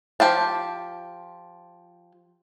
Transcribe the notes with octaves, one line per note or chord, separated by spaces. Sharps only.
F3 G4 F5 A5